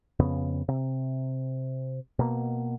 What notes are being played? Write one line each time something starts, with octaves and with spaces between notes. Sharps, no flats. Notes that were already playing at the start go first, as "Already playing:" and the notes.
F2 C#3 B3
C3
B2 A#3